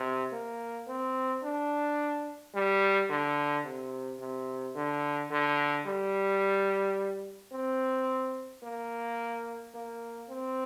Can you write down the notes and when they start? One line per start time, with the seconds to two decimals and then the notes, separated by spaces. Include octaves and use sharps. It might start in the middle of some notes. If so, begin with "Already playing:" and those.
Already playing: C3
0.32 A#3
0.88 C4
1.44 D4
2.54 G3
3.10 D3
3.65 C3
4.20 C3
4.75 D3
5.31 D3
5.86 G3
7.53 C4
8.63 A#3
9.74 A#3
10.29 C4